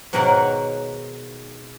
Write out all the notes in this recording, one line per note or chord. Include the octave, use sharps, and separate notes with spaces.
G#2 B2 D#3 A#4 C#5 F#5